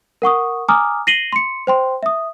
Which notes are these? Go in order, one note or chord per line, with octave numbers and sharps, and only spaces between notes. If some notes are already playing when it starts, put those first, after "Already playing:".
A#4 F#5 C#6 D#6
G#5 A#5 D6 D#6 F6
A#6 C7 D#7 F#7 G7
C6 C#7
C5 G5 C6
E5 D#6